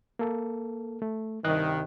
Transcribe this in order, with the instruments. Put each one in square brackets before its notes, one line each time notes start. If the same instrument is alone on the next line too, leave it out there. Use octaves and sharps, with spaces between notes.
[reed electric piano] A#3 A4
A3
[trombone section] C2 G2 D#3 [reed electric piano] D#5 F#6